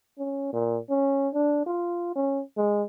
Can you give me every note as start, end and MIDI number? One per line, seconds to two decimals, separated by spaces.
0.18 0.49 61
0.53 0.78 46
0.89 1.29 61
1.34 1.63 62
1.66 2.13 65
2.15 2.42 61
2.57 2.83 56